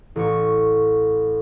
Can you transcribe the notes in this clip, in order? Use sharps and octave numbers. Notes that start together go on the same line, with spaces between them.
A1 C#6